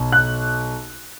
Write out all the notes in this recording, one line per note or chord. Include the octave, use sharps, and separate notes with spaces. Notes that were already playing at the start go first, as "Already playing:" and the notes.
Already playing: B1
F#6